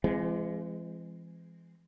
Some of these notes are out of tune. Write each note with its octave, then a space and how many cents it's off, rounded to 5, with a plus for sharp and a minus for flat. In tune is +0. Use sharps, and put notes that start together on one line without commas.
E3 +45 G#3 +0 C4 +0